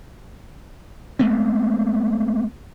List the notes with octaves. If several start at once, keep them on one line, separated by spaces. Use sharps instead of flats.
G#3 A3 B3 C4